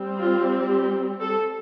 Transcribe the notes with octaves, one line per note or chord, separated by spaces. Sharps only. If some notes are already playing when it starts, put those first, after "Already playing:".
Already playing: G3 C4
F4
G4
A4